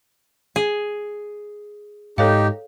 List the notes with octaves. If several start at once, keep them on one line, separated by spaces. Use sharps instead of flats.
G#4
G#2 D#4 G4 A4 C#5 F5